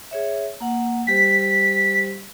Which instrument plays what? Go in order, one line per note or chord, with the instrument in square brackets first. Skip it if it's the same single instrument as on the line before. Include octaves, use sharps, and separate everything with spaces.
[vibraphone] G#4 C#5 E5
A#3 F#5
[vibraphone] G3 G4 C5 [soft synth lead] B6